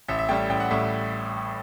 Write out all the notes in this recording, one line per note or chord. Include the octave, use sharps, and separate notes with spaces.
A1 E5
E5
A2 G3 G5
A1 G5
F#5
A2 G3 E5